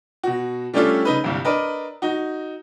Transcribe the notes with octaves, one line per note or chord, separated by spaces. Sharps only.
B2 F#4
G3 A3 C#4 D4 F4 A4
C#3 D#4 B4
G1 C2 G2
D4 A#4 B4 D#5
D#4 F#4